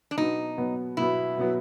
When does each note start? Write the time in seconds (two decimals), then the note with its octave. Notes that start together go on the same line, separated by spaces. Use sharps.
0.11 D4
0.17 B2 F#3 B3 D#4
0.57 B2 F#3 B3
0.97 B2 F#3 B3 E4
1.37 B2 F#3 B3